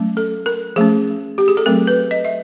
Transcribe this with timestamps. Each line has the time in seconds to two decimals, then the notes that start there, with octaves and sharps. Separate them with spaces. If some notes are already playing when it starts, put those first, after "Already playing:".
Already playing: F#3 A3 C#4
0.17 A4
0.46 A#4
0.76 F3 A3 C#4 G#4
1.38 G4
1.48 G#4
1.57 A4
1.66 F#3 A3 C4 A#4
1.87 B4
2.11 D#5
2.25 E5